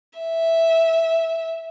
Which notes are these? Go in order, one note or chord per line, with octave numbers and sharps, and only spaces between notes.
E5